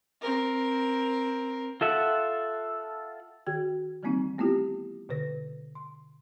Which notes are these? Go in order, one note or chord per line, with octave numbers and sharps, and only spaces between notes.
C4 A#4
F4 A4 E5 F#5
D#3 F#4 G#4 G5 G#6
D#3 E3 G3 A#3 C4 D#4
A3 B3 C4 E4 F4 G4
B2 D3 B4 A#6
C6